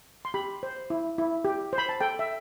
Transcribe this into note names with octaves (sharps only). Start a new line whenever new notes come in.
C6
G4 B5
C5
E4
E4
G4
C5
B5
A5
A4 G5
E5